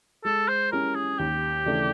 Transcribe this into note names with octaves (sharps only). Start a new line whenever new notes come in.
G#3 A4
C5
C#4 E4 G4 A#4
G#4
D#2 G4
C#3 E3 A3 D4